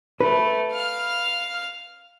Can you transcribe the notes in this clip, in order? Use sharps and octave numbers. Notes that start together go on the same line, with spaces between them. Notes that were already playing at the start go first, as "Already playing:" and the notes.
A3 B4
F5 F6